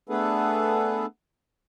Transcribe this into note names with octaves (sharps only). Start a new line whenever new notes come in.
A3 B3 D4 G#4 A4 B4